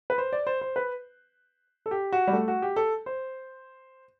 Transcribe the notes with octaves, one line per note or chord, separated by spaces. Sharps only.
B4
C5
D5
C5
C5
B4
A4
G4
F#4
G3
A3
F#4
G4
A4
C5